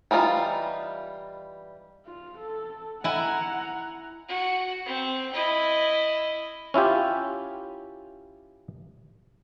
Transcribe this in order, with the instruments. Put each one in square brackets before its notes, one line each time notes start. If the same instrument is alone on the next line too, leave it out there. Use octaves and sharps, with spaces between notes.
[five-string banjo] E3 G3 D#4 F4
[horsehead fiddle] F4
A4
[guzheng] E4 G#5 [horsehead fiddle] F#5 A#5
[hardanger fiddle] F#4
C4
E4 D#5
[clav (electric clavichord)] C#4 E4 F4 G4